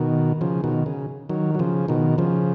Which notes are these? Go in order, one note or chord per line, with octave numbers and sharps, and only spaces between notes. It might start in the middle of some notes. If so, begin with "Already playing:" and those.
Already playing: B2 D#3
C#3 F3
B2 D#3
C#3
D#3 F#3
F#3
C#3 F3
B2 D#3
C#3 F3